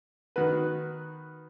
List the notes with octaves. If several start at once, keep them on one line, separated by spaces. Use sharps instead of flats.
D#3 B3 F#4 B4